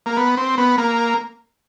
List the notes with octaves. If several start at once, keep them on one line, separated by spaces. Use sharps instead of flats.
A#3
B3
C4
B3
A#3